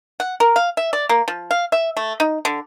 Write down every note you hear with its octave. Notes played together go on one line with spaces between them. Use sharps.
F#5
A#4
F5
E5
D5
A#3
F3
F5
E5
A3
D#4
D3